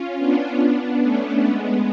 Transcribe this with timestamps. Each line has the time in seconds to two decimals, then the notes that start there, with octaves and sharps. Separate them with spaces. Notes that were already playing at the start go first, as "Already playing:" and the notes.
Already playing: C#4 F4
0.17 B3 D4
1.01 A3 C#4
1.44 G#3 B3